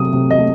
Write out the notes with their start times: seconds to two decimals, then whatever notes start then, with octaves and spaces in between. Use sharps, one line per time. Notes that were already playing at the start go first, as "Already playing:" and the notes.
Already playing: C3 F#3 A3 D#6
0.13 C3
0.31 D#5
0.39 A3